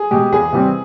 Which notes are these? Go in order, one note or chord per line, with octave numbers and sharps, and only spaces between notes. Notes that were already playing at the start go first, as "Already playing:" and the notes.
Already playing: G#4
B2 G#3 G4
E2 G#4
C3 E3 G3 C4